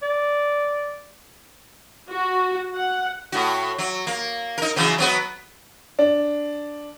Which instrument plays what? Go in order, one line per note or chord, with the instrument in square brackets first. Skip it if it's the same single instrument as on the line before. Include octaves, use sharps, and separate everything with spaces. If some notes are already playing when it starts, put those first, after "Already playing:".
[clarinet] D5
[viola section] F#4
F#5
[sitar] A2 F#4
F#3
A#3
D#4 A#4
C#3 E3 F#3
F#3 B3 B4
[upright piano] D4